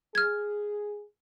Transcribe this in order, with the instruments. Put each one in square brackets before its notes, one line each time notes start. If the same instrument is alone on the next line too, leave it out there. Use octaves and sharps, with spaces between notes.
[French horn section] G#4 [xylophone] F6 G#6